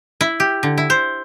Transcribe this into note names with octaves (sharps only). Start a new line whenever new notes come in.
E4
G4
D3
E4
C5